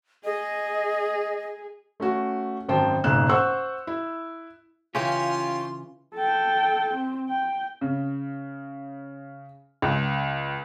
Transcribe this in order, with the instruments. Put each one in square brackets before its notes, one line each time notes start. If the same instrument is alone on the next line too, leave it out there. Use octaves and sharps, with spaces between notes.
[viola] G#4 [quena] D#5
[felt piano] A3 C#4 F#4
G#1 F#2 C5 G5 A5
F#1 B1 G#2 F#6 E7
C5 F#5 C6 C#6 E6 F#6
E4
[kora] C#3 E3 [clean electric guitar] C#4 G4 [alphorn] F4 [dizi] C6
[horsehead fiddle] A4 G5
C4
G5
[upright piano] C#3
C#2